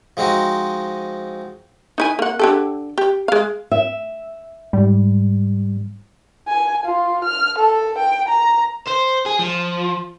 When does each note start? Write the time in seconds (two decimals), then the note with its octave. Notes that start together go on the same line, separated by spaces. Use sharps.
0.17 F3 G#3 C4 D#4 F#4
1.98 D#4 E4 G#5
2.19 A#3 F#5
2.39 D3 G4 A4
2.98 G4
3.28 G#3 F5
3.71 E5
4.73 G#2 G3
6.48 G#5
6.85 F4
7.24 F6
7.58 A4
7.98 G5
8.28 A#5
8.88 C5
9.26 G#4
9.39 F3